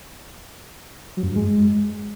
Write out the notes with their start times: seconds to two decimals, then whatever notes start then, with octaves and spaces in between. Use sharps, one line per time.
1.17 F#3
1.23 F#2
1.30 G2
1.36 G#3